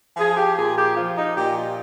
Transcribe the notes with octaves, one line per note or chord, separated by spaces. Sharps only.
F3 G#4
G4
A#2 G#4
G4
F3 F4
D#4
A#2 G4
F4